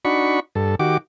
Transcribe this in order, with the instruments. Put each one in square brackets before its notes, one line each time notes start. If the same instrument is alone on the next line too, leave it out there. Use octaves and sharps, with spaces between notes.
[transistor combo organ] D4 D#4 F#4 B5 C#6
G2 A4
D#3 F#4 G4 D6